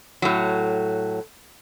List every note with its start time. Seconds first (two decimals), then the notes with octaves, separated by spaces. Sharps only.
0.22 A2 F#3